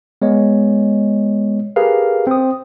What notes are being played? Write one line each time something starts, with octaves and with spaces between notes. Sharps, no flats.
G#3 B3 C#5 D#5
G4 G#4 A#4 B4 F5
C4 D#6